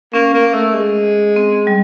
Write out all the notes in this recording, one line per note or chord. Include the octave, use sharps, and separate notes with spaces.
A#3 C#4
A#3
A3
G#3
C4
G3